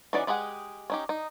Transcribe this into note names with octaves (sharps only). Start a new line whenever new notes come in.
E3 C#4 D#4 F#4 D5
G#3 G4 G#4 D#5 F#5
C#4 D#4 G4
D#4